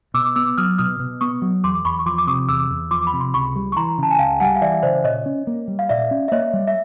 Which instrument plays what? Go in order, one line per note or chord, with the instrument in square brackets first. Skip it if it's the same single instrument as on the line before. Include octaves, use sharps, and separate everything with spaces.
[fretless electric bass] B2 [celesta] D6 E6
[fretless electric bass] B3 [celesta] D6 E6
[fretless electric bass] F#3 [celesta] D#6 F6
[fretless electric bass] B2 [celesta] D#6 F6
[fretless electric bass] B2
[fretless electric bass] B3 [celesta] C#6 D#6
[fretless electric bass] F#3
[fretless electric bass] E2 [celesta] C6 D6
[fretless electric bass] E2 [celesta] B5 C#6
[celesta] C#6
[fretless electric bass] F3 [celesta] C6 D6
[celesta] D6
[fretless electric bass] C3 [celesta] C#6 D#6
[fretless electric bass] E2 [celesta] D6 E6
[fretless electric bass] E2
[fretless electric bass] F3 [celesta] C6 D6
[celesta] B5
[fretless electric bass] C3
[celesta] C6
[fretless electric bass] C#2 [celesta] B5 C#6
[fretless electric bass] G3
[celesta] C#6
[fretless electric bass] E3 [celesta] A#5 C6
[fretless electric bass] C#3 [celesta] A5
[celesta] G#5
[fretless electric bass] C#2 [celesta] F5 G5
[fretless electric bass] G3 [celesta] F#5 G#5
[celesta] F5
[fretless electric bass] E3 [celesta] D5 E5
[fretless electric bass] C#3 [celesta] C5 D5
[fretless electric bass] A#2 [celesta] C#5 D#5
[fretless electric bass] C#4
A#3
G3
[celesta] F5
[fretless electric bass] A#2 [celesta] D5 E5
[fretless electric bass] C#4
[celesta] E5
[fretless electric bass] A#3 [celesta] C#5 D#5
[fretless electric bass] G3
[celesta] E5